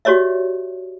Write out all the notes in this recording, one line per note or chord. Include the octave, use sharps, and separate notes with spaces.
F#4 G4 C#5 D5 E5